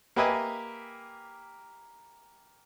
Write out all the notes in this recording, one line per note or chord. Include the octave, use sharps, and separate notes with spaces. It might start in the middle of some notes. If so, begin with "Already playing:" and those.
A#3 G4 B4 D#5 E5 G#5